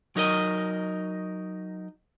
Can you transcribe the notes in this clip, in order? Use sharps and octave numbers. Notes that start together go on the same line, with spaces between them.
F#3 D#4 A#4 D#5